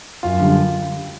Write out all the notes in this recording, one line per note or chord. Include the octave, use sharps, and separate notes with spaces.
F#2 F4
D3 G3